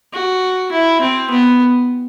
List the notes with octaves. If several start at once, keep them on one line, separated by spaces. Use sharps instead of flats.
F#4
E4
C4
B3